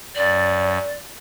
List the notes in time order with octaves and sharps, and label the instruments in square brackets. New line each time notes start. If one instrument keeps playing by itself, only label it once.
[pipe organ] F#2 [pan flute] D5